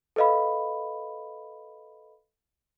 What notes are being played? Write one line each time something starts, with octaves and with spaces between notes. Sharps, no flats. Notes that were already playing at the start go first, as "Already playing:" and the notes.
A4 B4 D#5 F5 B5